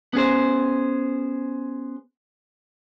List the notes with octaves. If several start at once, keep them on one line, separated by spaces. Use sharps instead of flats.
B3 C#4 G#4 C5